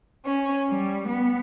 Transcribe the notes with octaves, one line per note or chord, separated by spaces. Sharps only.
C#4
G3
B3